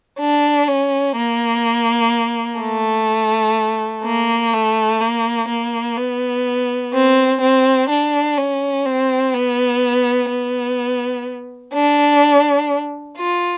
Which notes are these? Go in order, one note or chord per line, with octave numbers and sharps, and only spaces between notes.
D4
C#4
A#3
A3
A#3
A3
A#3
A#3
B3
C4
C4
D4
C#4
C4
B3
B3
D4
F4